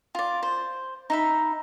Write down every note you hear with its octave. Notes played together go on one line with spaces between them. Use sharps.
F4 D5
C5
D#4 E5 B5